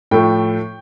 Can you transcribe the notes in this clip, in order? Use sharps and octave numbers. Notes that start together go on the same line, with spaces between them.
A2 F3 A3 G5